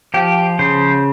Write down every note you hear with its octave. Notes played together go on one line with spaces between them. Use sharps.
F3 G4
C#3 C5